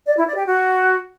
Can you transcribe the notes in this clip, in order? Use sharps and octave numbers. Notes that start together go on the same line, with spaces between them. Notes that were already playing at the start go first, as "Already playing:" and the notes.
D5
E4
D5
G4
F#4